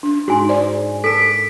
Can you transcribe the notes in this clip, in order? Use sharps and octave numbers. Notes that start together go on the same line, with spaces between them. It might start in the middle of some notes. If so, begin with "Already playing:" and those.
D4
G#2 F#4 G#5 C6
C5 D5
D4 A4 A#4 B6 D7